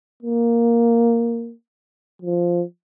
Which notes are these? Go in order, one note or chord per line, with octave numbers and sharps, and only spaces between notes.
A#3
F3